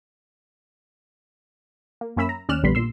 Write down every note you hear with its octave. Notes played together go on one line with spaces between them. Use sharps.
A#3
F#2 A#3 C#4 E5 B5 E6
A#5
D#2 C#4 D5 F6 F#6 E7
A#1 D3 G3 B3 B5 C6
A#2 C6 E6